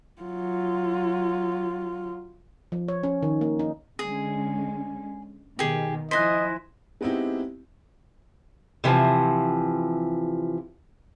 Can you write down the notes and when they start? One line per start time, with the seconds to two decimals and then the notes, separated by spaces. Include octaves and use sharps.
0.22 F#3 F4
2.72 F3
2.88 C#5
3.03 C#4
3.23 D#3
3.41 A#3
3.59 D#4
3.99 D3 G#3 C#4 G#4
5.59 B2 D#3 G4 G#4
6.11 F3 E4 C5 D#5 G#5 F#6 A#6 B6
7.01 G#3 B3 C4 D#4 E4 G4
8.84 C3 E3 F3